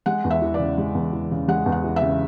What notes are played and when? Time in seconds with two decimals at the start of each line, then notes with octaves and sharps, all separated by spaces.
0.06 G#3 F#5
0.24 E2
0.30 E5
0.42 E3
0.54 C#3 D5
0.78 G#3
0.95 E2
1.13 E3
1.31 C#3
1.48 G#3 F#5
1.66 E2
1.72 F#5
1.84 E3
1.96 E5
2.02 C#3